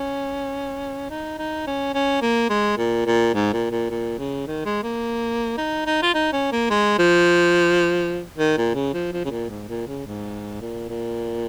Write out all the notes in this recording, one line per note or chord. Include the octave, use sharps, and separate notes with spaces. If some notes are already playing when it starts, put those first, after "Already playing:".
Already playing: C#4
D#4
D#4
C#4
C#4
A#3
G#3
A#2
A#2
G#2
A#2
A#2
A#2
C#3
D#3
G#3
A#3
D#4
D#4
F4
D#4
C#4
A#3
G#3
F3
D#3
A#2
C#3
F3
F3
C#3
A#2
G#2
A#2
C#3
G#2
A#2
A#2